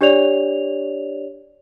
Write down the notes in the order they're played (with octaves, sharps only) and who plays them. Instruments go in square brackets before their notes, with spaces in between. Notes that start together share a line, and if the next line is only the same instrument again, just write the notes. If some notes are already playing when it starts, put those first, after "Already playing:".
[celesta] D4 G4 C#5 D5 F7